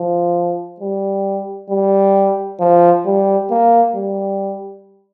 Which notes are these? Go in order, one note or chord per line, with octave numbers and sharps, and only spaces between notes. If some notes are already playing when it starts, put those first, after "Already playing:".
Already playing: F3
G3
G3
F3
G3
A#3
G3